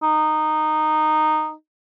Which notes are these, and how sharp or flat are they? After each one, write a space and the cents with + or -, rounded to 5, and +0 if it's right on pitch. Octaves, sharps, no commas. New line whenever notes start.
D#4 -10